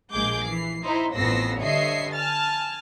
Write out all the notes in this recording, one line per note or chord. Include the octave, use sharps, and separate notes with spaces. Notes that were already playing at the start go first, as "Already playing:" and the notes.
A#1 G#3 A#3 G#4 D6 G6
E3 C7
D#4 E4 C5
A1 F2 B3 E6 A#6 C7
G2 D3 C#5 D#5 E5 C7
G#5 A5 F6 A6